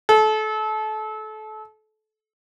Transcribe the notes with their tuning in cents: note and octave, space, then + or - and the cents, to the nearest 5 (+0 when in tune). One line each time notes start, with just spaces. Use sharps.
A4 -30